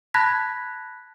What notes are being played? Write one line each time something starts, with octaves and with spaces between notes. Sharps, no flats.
A5 B5 F#6 G#6 A#6 B6